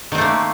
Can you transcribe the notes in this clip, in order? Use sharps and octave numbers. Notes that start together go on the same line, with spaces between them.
D#3 A3 A#3 C4